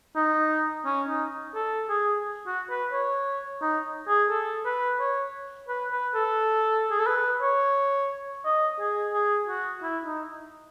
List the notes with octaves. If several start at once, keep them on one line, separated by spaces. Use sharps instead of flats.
D#4
C#4
D#4
A4
G#4
F#4
B4
C#5
D#4
G#4
A4
B4
C#5
B4
B4
A4
G#4
A4
B4
C#5
D#5
G#4
G#4
F#4
E4
D#4